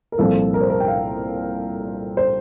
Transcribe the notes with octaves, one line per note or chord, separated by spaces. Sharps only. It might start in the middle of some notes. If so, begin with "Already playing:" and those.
A#4
C2 A#2 F3 C4 A4
A#4
C5
A#4
G5
F5
C5